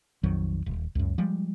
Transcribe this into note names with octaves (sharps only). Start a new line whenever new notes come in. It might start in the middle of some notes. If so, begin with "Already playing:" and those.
A#1 F2 D#3 F#3
D#1
C#2 F#2
F3 G3 G#3